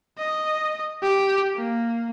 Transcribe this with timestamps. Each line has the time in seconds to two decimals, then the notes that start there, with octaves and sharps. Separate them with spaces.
0.18 D#5
1.03 G4
1.56 A#3